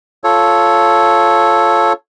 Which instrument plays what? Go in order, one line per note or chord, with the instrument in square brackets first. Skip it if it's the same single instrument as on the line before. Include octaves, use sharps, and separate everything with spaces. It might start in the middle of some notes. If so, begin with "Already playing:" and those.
[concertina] F4 A4 C#5